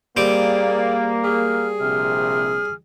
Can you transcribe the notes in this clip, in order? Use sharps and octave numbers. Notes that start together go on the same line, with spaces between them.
G3 A#3 C4 G#4 D5 D6
G#4 F6
A#1 C3 F6